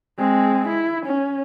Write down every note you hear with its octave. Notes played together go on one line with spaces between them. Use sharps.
G#3 C4
E4
C#4